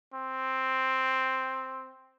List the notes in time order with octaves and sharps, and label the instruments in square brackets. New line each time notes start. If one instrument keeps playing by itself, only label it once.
[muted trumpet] C4